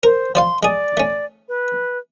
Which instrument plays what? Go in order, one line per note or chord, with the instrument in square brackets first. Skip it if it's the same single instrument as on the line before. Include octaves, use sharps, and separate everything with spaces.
[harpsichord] A#4 [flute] C5
[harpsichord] F3 D5 F5 [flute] C6
[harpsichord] G#3 G#4 [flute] D5
[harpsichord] A3 C#4
[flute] B4